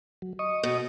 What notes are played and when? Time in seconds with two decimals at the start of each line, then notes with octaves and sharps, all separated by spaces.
0.22 F#3
0.39 D#5 C#6 D#6
0.63 B2